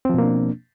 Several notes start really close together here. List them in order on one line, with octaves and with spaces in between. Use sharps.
C4 F3 B2 A#3 D4